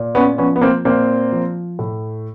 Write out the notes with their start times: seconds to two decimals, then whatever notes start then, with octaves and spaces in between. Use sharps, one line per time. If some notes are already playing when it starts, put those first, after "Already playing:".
Already playing: A#2
0.15 B3 C#4
0.38 F3 B3 C#4
0.56 B3
0.61 A#3 C4
0.85 A#2 A#3 C4
1.32 F3
1.79 A2